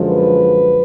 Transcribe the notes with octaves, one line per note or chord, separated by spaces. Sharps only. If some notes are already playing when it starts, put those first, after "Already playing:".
Already playing: F#2 D3 F3 G#3
B4